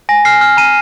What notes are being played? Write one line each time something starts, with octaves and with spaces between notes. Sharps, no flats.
G#5 A#6
F6 C7
F6
A#5 D#7